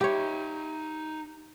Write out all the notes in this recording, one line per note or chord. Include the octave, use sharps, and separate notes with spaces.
D#4 G4 C#5 E5